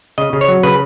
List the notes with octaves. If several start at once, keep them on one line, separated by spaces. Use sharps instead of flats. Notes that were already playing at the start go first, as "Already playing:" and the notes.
C#3 D#5
C#3
C#5
F#3
C#3 B4